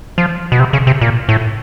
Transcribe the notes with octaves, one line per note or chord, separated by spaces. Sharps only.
F3
B2
C3
C#3
C3
A#2
A2